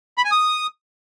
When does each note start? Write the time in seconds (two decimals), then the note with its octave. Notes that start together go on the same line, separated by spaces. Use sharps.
0.18 B5
0.25 G#5
0.32 D#6